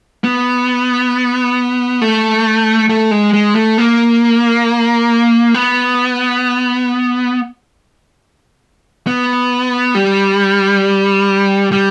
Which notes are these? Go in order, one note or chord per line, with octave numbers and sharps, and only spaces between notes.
B3
A3
A3
G#3
G#3
A3
A#3
B3
B3
G3
G3